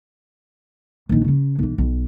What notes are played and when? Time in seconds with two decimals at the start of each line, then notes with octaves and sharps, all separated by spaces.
1.09 A#1 D#3
1.24 C#3 C#4
1.59 B1 E3
1.78 B1